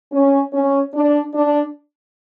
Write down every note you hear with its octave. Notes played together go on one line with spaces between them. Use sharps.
C#4
C#4
D4
D4